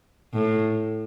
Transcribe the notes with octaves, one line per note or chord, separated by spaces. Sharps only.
A2